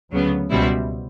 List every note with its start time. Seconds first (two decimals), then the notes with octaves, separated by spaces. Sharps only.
0.11 D2 C#3 F#3 B3
0.50 C#2 B2 G3 C4 E4